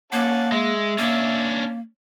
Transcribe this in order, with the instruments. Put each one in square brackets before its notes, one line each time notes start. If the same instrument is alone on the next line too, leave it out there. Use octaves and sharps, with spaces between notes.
[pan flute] A#3 [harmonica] C#4 F#5 A5
[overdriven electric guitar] G#3 [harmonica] E5
[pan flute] A#3 [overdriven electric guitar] C#4 D4